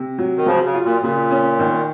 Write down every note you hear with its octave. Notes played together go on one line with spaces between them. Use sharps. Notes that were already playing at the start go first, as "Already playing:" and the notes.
Already playing: C3
F#3
D#3
C#3 F3 F#3
C#3
F4
A#2
A#2 C#3
C#4
D#3